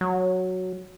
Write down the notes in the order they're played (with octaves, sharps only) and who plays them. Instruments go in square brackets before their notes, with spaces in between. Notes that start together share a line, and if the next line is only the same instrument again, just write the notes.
[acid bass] F#3